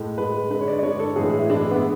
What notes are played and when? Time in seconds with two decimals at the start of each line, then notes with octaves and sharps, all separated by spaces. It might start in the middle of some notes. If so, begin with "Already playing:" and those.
Already playing: A2 G#3
0.18 A2 G#3 B4
0.50 D3 G#3 B4
0.61 C#5
0.68 D5
0.79 D5
0.83 D3 G#3 C#5
0.99 A4
1.16 A2 E3 G#3 G#4
1.39 E4
1.50 A2 E3 G#3 D4
1.71 B3